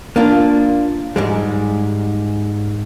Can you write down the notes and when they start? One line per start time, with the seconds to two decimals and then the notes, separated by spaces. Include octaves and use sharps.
0.16 A#3 D4 F4
1.16 G#2 G3 G#3